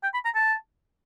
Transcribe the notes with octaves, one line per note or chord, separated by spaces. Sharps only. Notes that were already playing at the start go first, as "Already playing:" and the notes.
G5
B5
A#5
A5